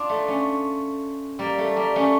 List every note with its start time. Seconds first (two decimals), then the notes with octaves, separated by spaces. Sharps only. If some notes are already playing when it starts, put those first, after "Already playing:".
Already playing: D4 F4
0.09 A3
0.28 A3 C#4
1.39 G3 A#3
1.58 A3
1.76 G3 A#3
1.95 A3 C#4